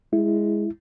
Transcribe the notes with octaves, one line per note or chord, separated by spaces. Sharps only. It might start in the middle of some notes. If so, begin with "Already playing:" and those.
G#3 E4